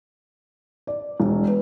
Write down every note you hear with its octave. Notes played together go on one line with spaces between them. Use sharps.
D5
E1
B4